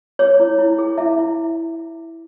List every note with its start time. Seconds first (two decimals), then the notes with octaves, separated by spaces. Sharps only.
0.19 G#4 C#5
0.40 E4
0.58 E4
0.78 G#4
0.98 E4 E5
1.18 E4